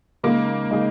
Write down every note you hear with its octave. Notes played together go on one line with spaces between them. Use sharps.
C#3 G#3 A#3 D#4 G#4
C#3 G#3 D#4 G#4